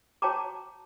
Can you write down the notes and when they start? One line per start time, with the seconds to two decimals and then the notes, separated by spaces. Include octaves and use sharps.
0.22 F#4 C#5 G5 A5 A#5 D6